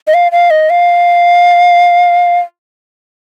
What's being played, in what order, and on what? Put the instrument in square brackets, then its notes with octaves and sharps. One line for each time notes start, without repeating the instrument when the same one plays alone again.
[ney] D#5
F5
F5
D#5
F5